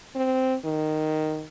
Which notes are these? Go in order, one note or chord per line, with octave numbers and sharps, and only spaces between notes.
C4
D#3